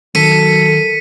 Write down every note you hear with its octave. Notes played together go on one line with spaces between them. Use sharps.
D#3 F#3 A4 B6 C#7 D#7